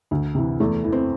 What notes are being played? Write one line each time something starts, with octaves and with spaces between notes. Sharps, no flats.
D2
C3 E3
E2 A3
E3
C4